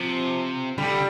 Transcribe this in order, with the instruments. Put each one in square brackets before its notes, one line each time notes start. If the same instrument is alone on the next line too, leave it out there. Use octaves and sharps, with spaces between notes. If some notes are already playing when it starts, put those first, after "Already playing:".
Already playing: [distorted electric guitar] C3 [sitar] F3
[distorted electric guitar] D3 [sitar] G3